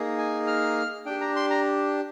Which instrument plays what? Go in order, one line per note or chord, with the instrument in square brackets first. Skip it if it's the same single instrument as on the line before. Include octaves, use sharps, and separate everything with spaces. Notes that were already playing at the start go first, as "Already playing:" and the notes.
Already playing: [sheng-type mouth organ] A#3 D#4 G#4
G#5
F6
D4 G4 G5
A#5
C6
A#5